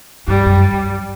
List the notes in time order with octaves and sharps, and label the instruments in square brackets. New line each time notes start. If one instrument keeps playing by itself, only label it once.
[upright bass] G2 [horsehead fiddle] G3
[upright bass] F#2